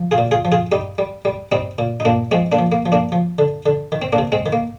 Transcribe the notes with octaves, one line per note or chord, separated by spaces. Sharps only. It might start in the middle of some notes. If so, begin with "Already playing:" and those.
Already playing: F3
F4 G#4
A#2
F4 G#4
F3
F4 G#4
G3 D#4 G4
G3
G3
G3 C4 D#4
A#2
D#4
A#2 A#3 D4
F3 G#3 C4
A#3 D4
F3
A#3
F3
A#3 D4
F3
D3
D3
D#3
C4
A#3 D4
C3
G#3 C4
D#3
A#3